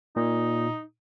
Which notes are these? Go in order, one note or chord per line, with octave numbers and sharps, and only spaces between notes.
A#2 D#4